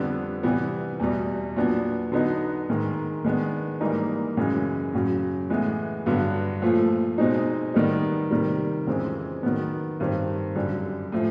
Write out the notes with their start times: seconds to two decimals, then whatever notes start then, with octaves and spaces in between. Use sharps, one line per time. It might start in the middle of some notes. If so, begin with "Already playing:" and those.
Already playing: F2 D3 G3 B3
0.43 C3 E3 G3 B3
1.00 E2 B2 G3
1.56 A#2 F#3 B3 D4
2.12 D3 F#3 B3 D#4
2.69 G#2 D#3 G#3
3.24 D#3 G#3 B3 D4
3.80 G#2 E3 G3 A#3 D#4
4.37 F#2 C#3 E3 G#3
4.94 F#2 C#3 F#3
5.50 A2 E3 G#3 B3
6.06 G2 D3 F#3 B3
6.62 A#2 F3 A3
7.18 B2 G#3 C4 D#4
7.74 D#3 G3 B3 D#4
8.31 C3 D#3 G3
8.87 F2 C#3 E3 G#3 C4
9.43 D#3 F#3 B3
10.00 G2 D#3 G3 C4
10.55 F#2 D3 G3
11.12 A2 F3